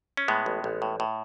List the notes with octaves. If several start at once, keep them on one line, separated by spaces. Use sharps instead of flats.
C#4
A2 G#3 B3
A1
A1
A2
A2